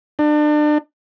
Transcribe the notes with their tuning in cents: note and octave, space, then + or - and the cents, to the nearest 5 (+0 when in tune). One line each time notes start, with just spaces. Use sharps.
D4 +35